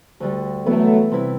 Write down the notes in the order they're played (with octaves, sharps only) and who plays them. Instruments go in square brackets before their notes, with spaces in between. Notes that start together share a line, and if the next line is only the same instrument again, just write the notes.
[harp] D2 D3 G3
[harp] E3 B3 E4 [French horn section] F#3 A3
[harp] C3 G3 C4 E4 B4